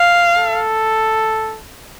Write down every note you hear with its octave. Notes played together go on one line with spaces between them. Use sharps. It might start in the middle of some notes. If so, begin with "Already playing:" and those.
Already playing: F5
A4